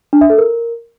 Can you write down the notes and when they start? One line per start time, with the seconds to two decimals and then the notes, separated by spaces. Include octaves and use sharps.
0.13 D4
0.21 E5
0.30 A4
0.38 A#4